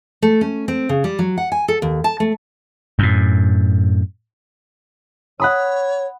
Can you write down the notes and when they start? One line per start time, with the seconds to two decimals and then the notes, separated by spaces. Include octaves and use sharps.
0.22 A3
0.41 C#4
0.68 C4
0.89 C#3
1.04 G3
1.19 F#3
1.38 F#5
1.52 G#5
1.68 A4
1.82 D#2
2.04 A5
2.20 A3
2.99 F#2 A2
5.40 C#5 F#5 B5 D#6